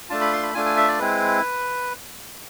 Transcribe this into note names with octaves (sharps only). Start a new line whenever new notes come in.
A3 D4 F4 A5
B5
C6
B5
A3 D4 F4 G#5
G#5
E5
D5
G#3 C4 E4 B4